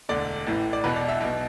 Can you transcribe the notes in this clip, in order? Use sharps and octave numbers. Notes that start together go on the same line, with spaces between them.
E1 D2 D3 D5
A1 A2 E3
D5
E1 E2 B2 B4
D5
E5
B1 B2